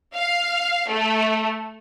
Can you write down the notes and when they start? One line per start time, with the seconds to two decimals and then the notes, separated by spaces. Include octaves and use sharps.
0.14 F5
0.89 A3